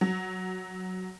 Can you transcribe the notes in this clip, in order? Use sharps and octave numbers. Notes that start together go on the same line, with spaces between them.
F#3